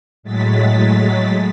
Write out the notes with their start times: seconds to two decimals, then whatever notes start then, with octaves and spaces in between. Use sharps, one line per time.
0.23 A2 F#3 G#3 A6 B6